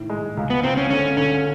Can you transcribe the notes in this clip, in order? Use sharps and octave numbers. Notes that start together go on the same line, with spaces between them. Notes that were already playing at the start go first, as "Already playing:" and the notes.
Already playing: A2 D#3
G#3
C#2
B3
C#2 C4
C#4
D3 C#4
D3 C#4